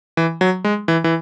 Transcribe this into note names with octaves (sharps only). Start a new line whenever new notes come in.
E3
F#3
G#3
E3
E3